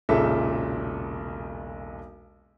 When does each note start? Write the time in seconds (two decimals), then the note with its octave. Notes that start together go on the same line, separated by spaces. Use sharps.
0.09 E1 B1 A#2 C#3 A4 E5